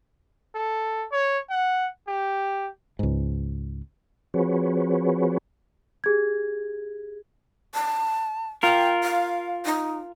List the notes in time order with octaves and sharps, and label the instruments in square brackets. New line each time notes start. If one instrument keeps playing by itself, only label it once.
[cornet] A4
C#5
F#5
G4
[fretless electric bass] C#2 G#2
[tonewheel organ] F3 C4 F#4 G#4 B4 C#5
[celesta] G4 G#4 G#6
[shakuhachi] A5
[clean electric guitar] F4 A#4 [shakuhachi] G5
[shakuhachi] F5
D#4